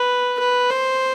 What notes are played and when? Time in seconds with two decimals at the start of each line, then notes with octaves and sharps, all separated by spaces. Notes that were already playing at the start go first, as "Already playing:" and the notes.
Already playing: B4
0.39 B4
0.70 C5